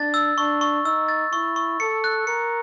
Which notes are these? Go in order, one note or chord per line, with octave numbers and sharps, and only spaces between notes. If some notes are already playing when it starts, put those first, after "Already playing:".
Already playing: D4 A6
E6
D4 C#6
C#6
D#4 E6
A6
E4 C#6
C#6
A4 C#7
F#6
A#4 C#7